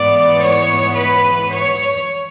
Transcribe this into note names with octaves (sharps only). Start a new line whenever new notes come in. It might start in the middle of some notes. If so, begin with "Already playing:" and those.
Already playing: G#2 E3 G#3 B3 D5
C#5
B4
C#5